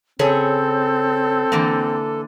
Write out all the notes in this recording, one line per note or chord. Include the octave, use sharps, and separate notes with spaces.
C#3 C4 G#4 A4 C#5
D3 E3 A#3